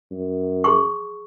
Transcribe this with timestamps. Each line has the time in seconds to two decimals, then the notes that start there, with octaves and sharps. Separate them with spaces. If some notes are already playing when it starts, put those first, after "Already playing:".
0.11 F#2
0.64 G#4 C6 C#6